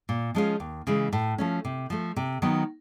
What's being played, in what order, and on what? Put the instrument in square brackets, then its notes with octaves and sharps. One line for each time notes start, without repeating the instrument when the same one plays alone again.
[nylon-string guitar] A#2
F3 G#3 C#4 F4
D#2
C#3 E3 G#3
A2
F3 A3 C#4
C3
F3 A3
C3
D#3 F#3 B3